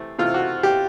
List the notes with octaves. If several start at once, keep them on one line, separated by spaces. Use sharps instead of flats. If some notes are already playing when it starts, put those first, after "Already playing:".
Already playing: C3 E3 A3 C4
C3 E3 A3 C4 F4
F#4
G4